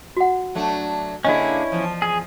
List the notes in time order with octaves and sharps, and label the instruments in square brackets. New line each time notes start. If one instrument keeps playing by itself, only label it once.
[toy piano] F#4 F#5
[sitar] F#3 A3 D4
[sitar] D3 A#3 G#4 [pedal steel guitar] C#4 E4 [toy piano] D5 D#5
[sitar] E2 F3
[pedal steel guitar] G#4